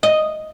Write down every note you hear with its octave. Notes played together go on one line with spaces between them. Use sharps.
D#5